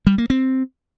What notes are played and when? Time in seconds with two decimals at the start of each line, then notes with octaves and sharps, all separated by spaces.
0.07 G3
0.18 A#3
0.30 C4